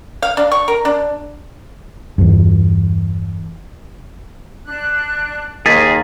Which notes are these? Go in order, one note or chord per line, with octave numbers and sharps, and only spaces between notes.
F5
D4
C#6
A#4
D4
E2 G2
D4 F#6
D#2 A#3 G#4 D#5 A6 B6 D#7